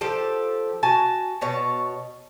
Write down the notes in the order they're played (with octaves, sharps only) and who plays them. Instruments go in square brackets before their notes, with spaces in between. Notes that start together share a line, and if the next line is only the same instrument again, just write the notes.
[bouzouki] F3 G4 A4
F#4 G#5 A5
B2 C#5 A5